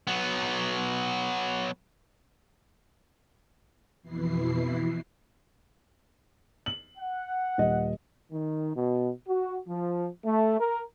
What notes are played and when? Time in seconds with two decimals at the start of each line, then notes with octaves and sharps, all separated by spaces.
0.07 F#3 B3
4.03 F2 B2 E3 E4 C7
6.66 F#7
6.98 F#5
7.58 D#1 D#5
8.32 D#3
8.76 B2
9.28 F#4
9.69 F3
10.25 A3
10.60 A#4